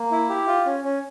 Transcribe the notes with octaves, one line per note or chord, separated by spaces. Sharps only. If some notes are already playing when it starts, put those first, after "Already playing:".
Already playing: A#3
E4
G4
F4
C#4
C#4